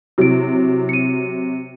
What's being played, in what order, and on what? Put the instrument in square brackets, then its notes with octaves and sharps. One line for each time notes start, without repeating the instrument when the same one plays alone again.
[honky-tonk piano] C3 F#3 [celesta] E4 D7
[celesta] C#7 D#7